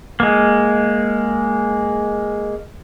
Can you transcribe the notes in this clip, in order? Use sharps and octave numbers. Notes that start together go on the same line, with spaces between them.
G#3 A#3